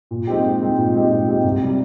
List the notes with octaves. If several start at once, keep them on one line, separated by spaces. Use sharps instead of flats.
A#2
G#3 C4 D#4 G4
A#2
G#3 C4 D#4 G4
A#2
G#3 C4 D#4 G4
A#2
G#3 C4 D#4 G4
C2
C3 G3